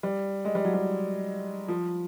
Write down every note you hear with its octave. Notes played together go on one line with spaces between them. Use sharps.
G3
G#3
G3
F#3
G3
F3